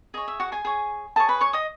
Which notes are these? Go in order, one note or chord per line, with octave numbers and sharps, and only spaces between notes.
G#4 C#5 D#5
E5
F#4 F#5
G#4 G#5
G#4 C#5
G#4 A4 C#5 A5
B4 B5
C#5 C#6
D#5 D#6